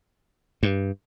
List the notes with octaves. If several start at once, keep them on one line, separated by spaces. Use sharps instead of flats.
G2